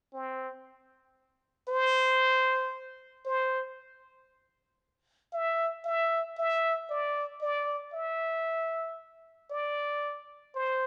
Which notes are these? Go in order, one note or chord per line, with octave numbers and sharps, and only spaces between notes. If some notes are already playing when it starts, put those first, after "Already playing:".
C4
C5
C5
E5
E5
E5
D5
D5
E5
D5
C5